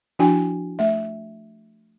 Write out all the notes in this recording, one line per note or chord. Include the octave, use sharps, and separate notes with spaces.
F3 D4 E4 F#4 G5 G#5
A3 E5